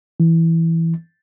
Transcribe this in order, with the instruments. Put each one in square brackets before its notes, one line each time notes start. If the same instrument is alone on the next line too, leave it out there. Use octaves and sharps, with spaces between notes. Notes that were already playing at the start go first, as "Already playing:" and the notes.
[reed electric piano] E3